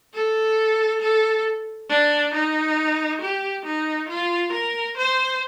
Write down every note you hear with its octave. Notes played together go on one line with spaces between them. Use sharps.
A4
A4
D4
D#4
G4
D#4
F4
A#4
C5